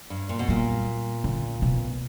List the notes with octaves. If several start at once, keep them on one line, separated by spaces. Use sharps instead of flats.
G2
A#2
B2
A#2 G3
D3
B2